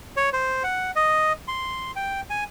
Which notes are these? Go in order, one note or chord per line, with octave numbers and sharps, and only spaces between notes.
C#5
C5
F#5
D#5
C6
G5
G#5